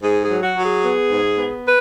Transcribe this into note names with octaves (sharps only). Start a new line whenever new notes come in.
G#2 G#4
G#4
F#3
F#4
F#3
G#4
B3
G#2
B3
B4